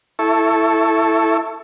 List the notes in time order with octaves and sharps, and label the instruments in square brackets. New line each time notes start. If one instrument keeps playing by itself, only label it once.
[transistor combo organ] E4 A4 C#6